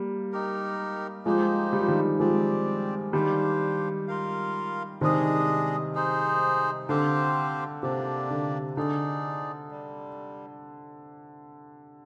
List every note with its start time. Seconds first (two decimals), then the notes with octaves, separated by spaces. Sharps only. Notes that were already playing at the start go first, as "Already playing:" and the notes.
Already playing: G3 A#3
0.32 D#4 G4 A#4
1.25 F3 G#3 A#3 D#4 G4 C5
1.73 G3
1.81 F3
1.88 D#3 G3
2.20 F3 G#3 C4 G4 D5
3.13 D#3 G3 D4 G4 C5 F5
4.08 F4 A#4 F5
5.01 C3 D#3 G#3 D4 G#4 D#5
5.95 D#4 G#4 C5
6.89 D3 C4 G4 C5 F5
7.83 C3 A#3 D4 G4 D5
8.30 D3
8.76 D3 D#4 G#4 D5
9.71 G3